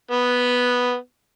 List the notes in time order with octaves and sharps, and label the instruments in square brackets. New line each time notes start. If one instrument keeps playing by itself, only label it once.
[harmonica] B3